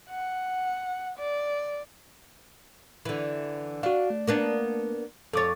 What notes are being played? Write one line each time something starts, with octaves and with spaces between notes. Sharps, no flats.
F#5
D5
D3 E3
D4 F#4 F5
A3
A#3 B3 D4
F2 A4 C#5 D6 A6